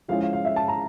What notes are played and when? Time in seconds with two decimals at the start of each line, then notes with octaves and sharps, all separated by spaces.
0.08 F3 G#3 C#4 E4 F5
0.21 F5
0.33 F5
0.45 E5
0.56 A5
0.68 A#5